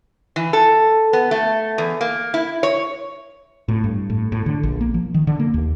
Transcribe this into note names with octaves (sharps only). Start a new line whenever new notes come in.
E3
A4
B3
A3
E2
A#3
E4
C#5
A2
G2
A2
A2
D3
A#1
A#3
F3
D#3
D3
A#3
D#2